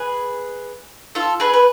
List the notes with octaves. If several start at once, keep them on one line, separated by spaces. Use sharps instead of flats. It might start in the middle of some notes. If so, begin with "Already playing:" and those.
Already playing: G#4 B4
F4 A4
G#4 B4
B4